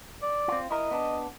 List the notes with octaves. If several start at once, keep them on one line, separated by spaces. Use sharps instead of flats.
D5
C4 F4
E4 A#4 D#5
B3 D4